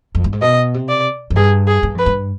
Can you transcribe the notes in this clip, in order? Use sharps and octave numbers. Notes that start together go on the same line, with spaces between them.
F2
G2
G#2
B2 D#5
C3
D5
F2
G2 G#4
G#4
G2
F2 B4
G2